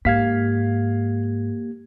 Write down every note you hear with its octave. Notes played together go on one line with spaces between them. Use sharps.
G#2 A#3 G4 F5 G#6 B6